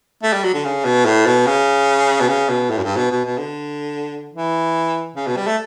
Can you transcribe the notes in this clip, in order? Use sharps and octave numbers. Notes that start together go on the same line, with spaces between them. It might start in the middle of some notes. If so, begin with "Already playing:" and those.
A3
G3
F#3
D3
C#3
B2
A2
B2
C#3
B2
C#3
B2
A2
F#2
G2
B2
B2
B2
D3
E3
C#3
B2
G3
A3